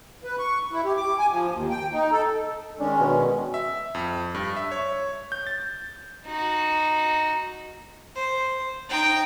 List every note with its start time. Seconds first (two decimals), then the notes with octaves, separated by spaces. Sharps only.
0.24 B4
0.39 C#6
0.72 E4
0.85 G4
0.97 D6
1.19 G#5
1.30 F3
1.53 D#2
1.70 G5
1.92 D#4
2.12 A4
2.79 D#3 G#3 C#4 D4
3.00 B2
3.54 E5
3.95 F2
4.35 G2
4.56 E5
4.72 C#5
5.32 G6
5.47 A6
6.26 D#4 F#4
8.16 C5
8.89 D#4 G5